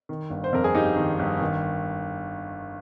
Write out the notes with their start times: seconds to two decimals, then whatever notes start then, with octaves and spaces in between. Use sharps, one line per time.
0.09 D#3
0.30 G1
0.44 C5
0.53 F2 A#4
0.64 G#4
0.75 G1 D#4 G4
0.96 D#3
1.19 G1
1.41 D#3